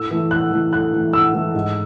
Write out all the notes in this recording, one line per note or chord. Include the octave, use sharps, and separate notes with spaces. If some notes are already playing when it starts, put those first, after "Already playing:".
Already playing: A2 E6
E3 A3
A2 F#6
E3 A3
A2 F#6
E3 A3
A2 E6
E3 A3
G#2